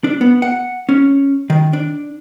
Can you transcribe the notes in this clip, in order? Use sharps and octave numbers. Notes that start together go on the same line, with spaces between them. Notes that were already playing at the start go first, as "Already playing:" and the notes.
D4
B3
F#5
C#4
D#3
D4